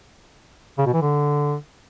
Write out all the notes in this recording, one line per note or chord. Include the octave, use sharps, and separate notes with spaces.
C#3
B2
E3
D3